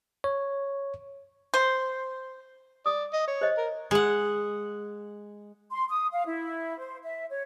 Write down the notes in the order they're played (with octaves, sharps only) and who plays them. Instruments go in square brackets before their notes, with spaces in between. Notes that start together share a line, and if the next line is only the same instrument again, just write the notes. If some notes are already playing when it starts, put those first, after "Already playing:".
[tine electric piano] C#5
[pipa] C5
[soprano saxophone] D5 [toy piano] D#6
[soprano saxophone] D#5
C#5
[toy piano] C5 D#5
[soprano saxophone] A#4
[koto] G#3 F#5
[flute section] C6
D#6
F5
E4
C5
E5
C#5